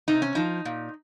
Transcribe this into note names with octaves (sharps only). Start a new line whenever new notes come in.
C3 D#4
C#4
F3 D#4
A#2